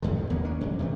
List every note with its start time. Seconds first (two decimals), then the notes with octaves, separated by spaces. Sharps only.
0.02 A1 F#2 D3
0.16 G2
0.30 D#2 A#3 B3
0.45 C#4 D4
0.61 F2 F#3
0.79 C3 E3 G3 A3